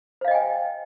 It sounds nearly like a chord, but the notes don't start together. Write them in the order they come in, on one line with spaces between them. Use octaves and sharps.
C5 F5 D#5 G5 G#5